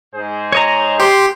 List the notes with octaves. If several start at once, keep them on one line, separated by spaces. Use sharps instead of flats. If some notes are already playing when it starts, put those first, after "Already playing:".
G#2 G#4 C5
C#5 D#5 A#5
G4 C6